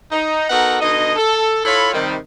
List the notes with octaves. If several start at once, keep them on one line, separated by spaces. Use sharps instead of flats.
D#4
B3 D#4 F#4 A4 A#4 F#5
B2 D3 D#4 D#5
A4
E4 F4 A4 C#5 B5
C3 D#3 G3